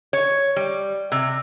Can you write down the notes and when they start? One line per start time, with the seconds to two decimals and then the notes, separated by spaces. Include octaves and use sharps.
0.13 C#5
0.56 G3
1.12 C3